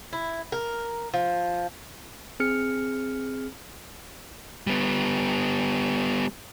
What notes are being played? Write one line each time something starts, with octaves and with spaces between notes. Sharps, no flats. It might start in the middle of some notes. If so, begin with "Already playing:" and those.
E4
A#4
F3
C4 G#4 F6 C#7
G3 B3